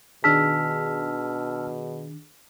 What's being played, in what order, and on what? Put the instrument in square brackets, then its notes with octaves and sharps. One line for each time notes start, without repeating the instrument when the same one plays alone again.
[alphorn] B2 [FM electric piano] D#3 D4 G#4 [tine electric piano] A5 E6 F6 [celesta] B6